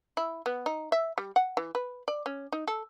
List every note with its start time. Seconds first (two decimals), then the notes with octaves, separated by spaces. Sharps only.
0.17 E4
0.46 B3
0.66 D#4
0.92 E5
1.18 G3
1.36 F#5
1.57 E3
1.75 B4
2.08 D5
2.26 C#4
2.52 D#4
2.67 A4